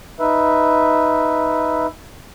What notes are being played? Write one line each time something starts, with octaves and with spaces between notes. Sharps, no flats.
D#4 B4 E5